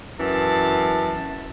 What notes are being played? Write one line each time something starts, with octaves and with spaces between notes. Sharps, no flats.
F#2 E3 A5